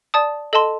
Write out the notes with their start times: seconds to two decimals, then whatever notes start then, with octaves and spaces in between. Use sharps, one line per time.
0.14 D5 A5 D#6
0.53 A4 D#5 A5 C6